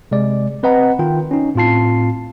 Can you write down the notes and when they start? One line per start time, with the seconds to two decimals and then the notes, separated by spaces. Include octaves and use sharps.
0.11 C3 G#3 D5
0.63 C4 B4 D#5 F#5 A#5
0.99 D#3 F4 G5
1.31 C#4 D#4
1.55 A2 C4 F4 A5 C7